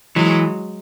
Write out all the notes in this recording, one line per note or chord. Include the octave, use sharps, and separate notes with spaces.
E3 F#3 G#3